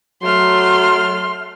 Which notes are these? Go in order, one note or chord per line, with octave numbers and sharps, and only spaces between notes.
F#3 A3 C6 F6